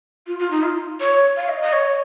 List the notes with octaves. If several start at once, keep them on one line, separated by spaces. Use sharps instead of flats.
F4
F4
D#4
F4
C#5
F5
D#5
D#5
C#5